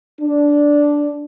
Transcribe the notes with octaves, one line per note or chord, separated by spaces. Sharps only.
D4